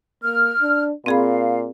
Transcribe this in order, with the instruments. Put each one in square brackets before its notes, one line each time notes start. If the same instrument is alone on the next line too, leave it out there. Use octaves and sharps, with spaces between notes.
[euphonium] A#3 [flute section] F6
[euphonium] D4
[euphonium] A#2 [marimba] C4 G#4 B5 [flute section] F5